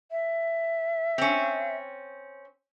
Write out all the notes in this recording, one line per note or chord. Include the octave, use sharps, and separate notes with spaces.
E5
C4 C#4